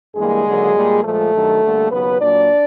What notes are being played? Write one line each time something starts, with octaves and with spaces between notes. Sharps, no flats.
G2 E3 G3 G#3 A#3 G#4
D#2 D3 F#3 A#3
A#2 G3 A#3
A#2 F3 G#3 A3 A4
G2 D#3 F#3
D2 D3 G3 A#3
D#2 C#3 F#3 B3 B4
A#2 F#3 A#3 D4 D5